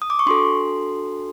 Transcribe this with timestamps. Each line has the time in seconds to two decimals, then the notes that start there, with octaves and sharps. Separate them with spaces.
0.02 D#6
0.10 D6
0.19 C#6
0.26 D4 F#4 A4 C6